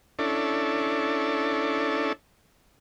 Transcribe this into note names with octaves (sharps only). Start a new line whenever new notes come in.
C#4 D4 E4 A4